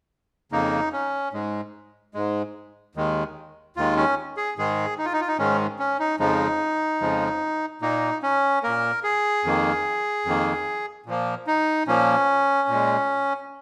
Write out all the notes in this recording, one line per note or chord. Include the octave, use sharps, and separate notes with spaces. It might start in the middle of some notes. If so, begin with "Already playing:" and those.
F2 C#3 A#3 D#4
C#4
G#2 G#3
G#2 G#3
D#2 D#3 G#3
D#2 D#3 G#3 F4
C#4
G#4
G#2 D#3 G#3 G#4
D#4
F4
D#4
F4
D#4
G#2 D#3 G#3 C#4
C#4
D#4
F2 C#3 F3 G#3 D#4
F2 C#3 F3 G#3
A#2 A#3 D#4
C#4
A#2 A#3 A#4
G#4
F2 D#3 A#3
F2 D#3 A#3
A#2 F3 A#3
D#4
A#2 F3 A#3 C#4
A#2 G#3